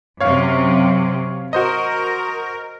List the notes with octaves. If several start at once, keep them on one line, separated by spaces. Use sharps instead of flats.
F#2 C3 F#3 C#5 F5
F#4 A#4 C5 D#5